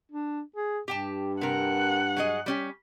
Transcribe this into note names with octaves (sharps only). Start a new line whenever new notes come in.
D4
G#4
G2 G4 G5 A5
C3 A#4 F#5
F#3 G#4 D#5
G3 C#4 G4